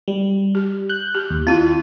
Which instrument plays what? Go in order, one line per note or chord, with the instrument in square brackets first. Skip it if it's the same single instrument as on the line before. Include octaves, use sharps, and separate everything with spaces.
[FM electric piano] G3
[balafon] G4
[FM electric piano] F#6 G6
[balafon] G4
[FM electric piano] D#2
[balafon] C4 E4 [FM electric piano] F4